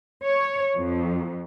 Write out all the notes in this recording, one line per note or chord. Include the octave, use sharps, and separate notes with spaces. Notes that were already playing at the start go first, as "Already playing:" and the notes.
C#5
F2